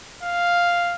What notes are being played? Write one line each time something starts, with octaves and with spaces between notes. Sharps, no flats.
F5